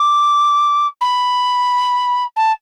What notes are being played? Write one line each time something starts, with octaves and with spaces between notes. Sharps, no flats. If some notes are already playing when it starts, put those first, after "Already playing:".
Already playing: D6
B5
A5